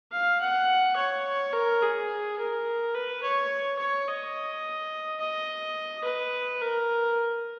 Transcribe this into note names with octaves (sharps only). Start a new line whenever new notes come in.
F5
F#5
C#5
A#4
G#4
A#4
B4
C#5
C#5
D#5
D#5
B4
A#4